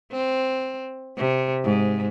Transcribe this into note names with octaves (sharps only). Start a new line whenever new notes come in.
C4
C3
G#2